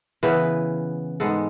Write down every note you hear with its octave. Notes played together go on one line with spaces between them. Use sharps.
C#3 E3 B3 B4
G#2 G#3 B3 A4